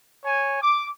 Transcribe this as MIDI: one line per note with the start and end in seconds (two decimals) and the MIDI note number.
0.25 0.58 73
0.25 0.58 80
0.62 0.88 86